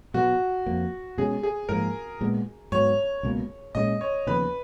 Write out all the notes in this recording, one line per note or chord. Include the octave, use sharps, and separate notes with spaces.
B2 F#3 B3 F#4
F2 F3 A#3
B2 G#3 C#4 G#4
G#4
G#2 F3 A#3 A#4
A#2 G#3 B3
G#2 F#3 B3 C#5
C#2 B2 A#3
A#2 G#3 C#4 D#5
C#5
D#2 C#3 F3 B3 B4